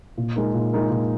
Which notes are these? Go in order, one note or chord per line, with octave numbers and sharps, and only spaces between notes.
A#2
G#3 D#4 A#4
A#2
G#3 D#4 A#4
A#2